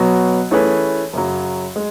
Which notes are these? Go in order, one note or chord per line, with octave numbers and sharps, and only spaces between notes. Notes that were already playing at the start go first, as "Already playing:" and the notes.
Already playing: B2 F#3 B3 F#4
E3 A3 C#4 G#4 B4
F#2 C#3 F#3
G#3